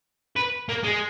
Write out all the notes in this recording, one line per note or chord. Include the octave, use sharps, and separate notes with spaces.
B4
A#3
G#3